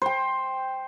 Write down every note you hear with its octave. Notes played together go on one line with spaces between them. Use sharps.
C5 G5